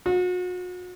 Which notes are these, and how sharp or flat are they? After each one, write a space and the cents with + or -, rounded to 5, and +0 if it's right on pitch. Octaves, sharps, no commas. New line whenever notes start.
F#4 -40